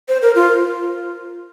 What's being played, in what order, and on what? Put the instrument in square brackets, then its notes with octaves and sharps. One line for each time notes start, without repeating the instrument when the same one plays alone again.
[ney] C5
A#4
F4